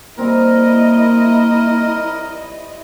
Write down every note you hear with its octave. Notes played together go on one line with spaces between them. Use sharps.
G3 A#3 C4 E4 A#4 D#5